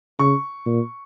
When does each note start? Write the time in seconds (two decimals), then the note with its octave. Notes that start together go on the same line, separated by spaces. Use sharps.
0.19 C#3 C#6
0.66 A#2